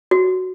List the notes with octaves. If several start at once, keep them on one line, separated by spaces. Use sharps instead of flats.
F#4